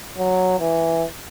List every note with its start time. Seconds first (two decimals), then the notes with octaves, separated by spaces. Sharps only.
0.18 F#3
0.60 E3